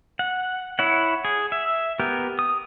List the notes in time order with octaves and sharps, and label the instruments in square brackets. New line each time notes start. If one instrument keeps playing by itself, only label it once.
[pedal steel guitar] F#5
E4 C#5 F#5
G#4
E5
B3 G4 A#4
D#6